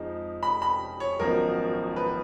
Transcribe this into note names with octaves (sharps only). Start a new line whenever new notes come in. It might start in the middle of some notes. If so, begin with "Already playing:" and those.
Already playing: F2 F3 G#3 D#4
B5
B5
C#5
G#1 F#2 F3 B3 D#4 A#4
B4